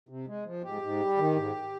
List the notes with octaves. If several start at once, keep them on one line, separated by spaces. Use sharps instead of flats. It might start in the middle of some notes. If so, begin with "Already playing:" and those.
C3
G#3
F3
G#2 G4
G#2
G3
D#3
G#2